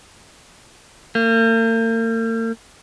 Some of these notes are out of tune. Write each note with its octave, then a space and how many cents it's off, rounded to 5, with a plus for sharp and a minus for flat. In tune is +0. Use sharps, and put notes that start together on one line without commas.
A#3 -45